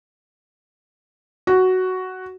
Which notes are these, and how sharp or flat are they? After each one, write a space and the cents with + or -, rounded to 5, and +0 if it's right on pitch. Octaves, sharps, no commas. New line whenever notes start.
F#4 +5